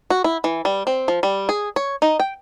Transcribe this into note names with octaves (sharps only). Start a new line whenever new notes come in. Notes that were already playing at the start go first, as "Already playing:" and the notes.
F#4
E4
E3
G3
C4
F3
G3
G#4
C#5
D#4
G5